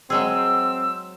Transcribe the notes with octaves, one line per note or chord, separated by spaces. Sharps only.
F#3 G#3 C4 G#4 E6